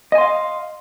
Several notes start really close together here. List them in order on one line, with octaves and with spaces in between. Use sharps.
D#5 G#5 C6 F5